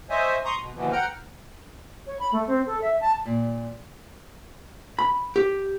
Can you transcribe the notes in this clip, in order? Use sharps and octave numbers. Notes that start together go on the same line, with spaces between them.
C5 C#5 D#5 E5 G#5
A#5 C6 C#6 D#6
B2
D#2 B2 D3 E3 F3
F#5 G5 A#5 F6
C#5
B5
A3
C4
A4
E5
A5
A#2
B5
G4